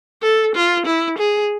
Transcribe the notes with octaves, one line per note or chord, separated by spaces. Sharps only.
A4
F4
E4
G#4